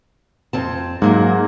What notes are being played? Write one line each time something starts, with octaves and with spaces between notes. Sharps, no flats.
F2 C4 A5
G#2 F#3 A#3